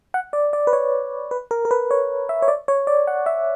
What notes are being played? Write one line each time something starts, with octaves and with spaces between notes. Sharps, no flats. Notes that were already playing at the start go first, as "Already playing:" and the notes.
F#5
D5
D5
B4
C#5
B4
A#4
A#4
B4
C#5
E5
C#5
D5
C#5
D5
F#5
E5